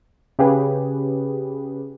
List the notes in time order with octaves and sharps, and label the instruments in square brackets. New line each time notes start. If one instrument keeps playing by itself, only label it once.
[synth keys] C#3 G4 G#4 B4